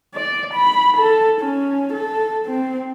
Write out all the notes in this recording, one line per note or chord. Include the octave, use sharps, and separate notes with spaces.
D5
B5
A4
C#4
A4
C4